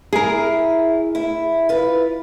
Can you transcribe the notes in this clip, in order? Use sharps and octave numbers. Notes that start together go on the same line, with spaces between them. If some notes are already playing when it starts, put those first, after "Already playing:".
E4 G#4 A#4
E4
F4 B4